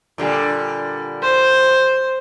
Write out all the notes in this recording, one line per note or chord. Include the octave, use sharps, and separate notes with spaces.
A#2 D3 G3
C5